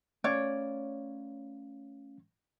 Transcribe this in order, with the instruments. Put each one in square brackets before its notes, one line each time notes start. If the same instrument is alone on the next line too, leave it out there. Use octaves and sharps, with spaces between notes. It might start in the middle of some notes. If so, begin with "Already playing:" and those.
[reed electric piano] A3 C#4 F5 [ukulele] C#5 D5